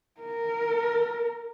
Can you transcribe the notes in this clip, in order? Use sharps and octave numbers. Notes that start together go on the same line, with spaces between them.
A#4